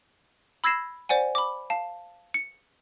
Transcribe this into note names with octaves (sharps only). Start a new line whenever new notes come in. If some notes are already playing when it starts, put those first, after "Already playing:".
B5 E6 G#6 A#6 C7 E7
C5 D5 F#5 G#5
B5 D6
F5 A5
C#7